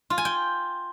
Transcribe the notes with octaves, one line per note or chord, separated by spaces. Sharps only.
F4
G#5
G5